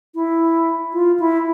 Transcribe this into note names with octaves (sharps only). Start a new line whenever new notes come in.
E4
F4
E4